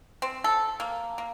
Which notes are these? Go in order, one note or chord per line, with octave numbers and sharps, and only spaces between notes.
C4
A4
A#3
A#3